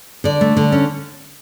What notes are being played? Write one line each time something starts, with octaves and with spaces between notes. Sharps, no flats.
D3 D5
A3
D3
C#4